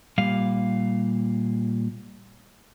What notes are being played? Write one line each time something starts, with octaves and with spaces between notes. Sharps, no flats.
A#2 G3 F5